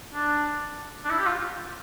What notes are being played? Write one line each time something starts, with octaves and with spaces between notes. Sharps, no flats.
D4
D4
E4
G4
F4